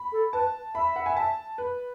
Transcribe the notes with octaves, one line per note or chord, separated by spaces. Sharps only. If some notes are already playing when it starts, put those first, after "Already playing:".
Already playing: B5
A4
B4 A5
E5 B5
F#5
G#5
A5
B4